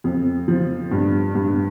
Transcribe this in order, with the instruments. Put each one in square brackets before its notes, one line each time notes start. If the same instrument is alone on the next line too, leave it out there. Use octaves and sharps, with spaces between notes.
[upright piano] F2
F3
G2
G2